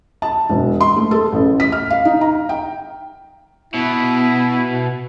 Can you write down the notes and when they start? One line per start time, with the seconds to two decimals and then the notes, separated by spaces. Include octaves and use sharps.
0.22 A5
0.49 E1
0.81 C6
0.96 A3
1.11 A4
1.32 A1
1.60 B6
1.72 F6
1.90 F5
2.05 D#4
2.21 A#5
2.49 G5
3.74 B2 E4